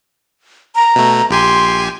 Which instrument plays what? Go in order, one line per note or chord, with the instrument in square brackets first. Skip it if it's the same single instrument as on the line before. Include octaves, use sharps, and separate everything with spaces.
[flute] A#5
[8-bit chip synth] B2 A3
[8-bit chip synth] A#1 G4 G#5 [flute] C6